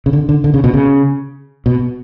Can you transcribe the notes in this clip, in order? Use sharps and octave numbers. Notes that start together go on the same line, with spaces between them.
C#3
D3
D3
D3
C#3
B2
C#3
B2